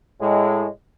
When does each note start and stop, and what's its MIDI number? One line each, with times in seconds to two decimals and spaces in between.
0.21 0.67 45
0.21 0.67 56